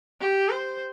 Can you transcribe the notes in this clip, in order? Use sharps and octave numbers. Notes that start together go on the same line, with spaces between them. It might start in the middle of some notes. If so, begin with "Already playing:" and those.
G4
C5